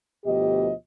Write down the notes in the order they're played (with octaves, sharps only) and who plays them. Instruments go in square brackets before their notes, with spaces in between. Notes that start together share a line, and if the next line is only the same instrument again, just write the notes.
[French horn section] D2 B2 F3 G4 D#5